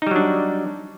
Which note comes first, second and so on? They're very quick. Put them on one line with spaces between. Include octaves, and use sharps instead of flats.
D#4 G3 F#3 D4